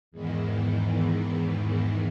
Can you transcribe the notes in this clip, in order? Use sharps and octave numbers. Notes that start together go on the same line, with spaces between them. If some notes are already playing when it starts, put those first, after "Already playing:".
E2 G#2 D#3 E3